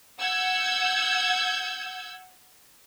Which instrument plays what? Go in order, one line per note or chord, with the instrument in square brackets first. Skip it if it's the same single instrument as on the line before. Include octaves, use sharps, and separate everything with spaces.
[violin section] F#5 E6 G6 G#6